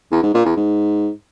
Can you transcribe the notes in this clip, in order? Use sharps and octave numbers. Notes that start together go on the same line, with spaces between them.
E2
G#2
A#2
E2
G#2